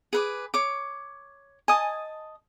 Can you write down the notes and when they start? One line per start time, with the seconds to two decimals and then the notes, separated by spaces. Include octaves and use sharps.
0.13 G#4 B4 D6
0.54 C#5 D6
1.68 D#5 G#5 A5 D#6